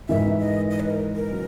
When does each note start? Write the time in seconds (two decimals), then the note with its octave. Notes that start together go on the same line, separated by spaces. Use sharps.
0.09 G#2 E3 G#3 D#4 A#4 E5
0.40 D#5
0.70 D#5
0.80 B4
0.90 A#4
1.15 A#4
1.31 F#3 C#4